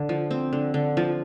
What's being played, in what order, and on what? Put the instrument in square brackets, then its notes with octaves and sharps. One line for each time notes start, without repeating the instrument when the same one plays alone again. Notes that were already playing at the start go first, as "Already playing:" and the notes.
Already playing: [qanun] D3
F3
C4
D3
D3
F3